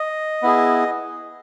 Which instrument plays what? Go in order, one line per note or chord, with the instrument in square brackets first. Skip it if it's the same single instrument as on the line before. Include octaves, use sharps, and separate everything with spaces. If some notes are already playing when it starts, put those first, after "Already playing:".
Already playing: [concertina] D#5
B3 E4 G#4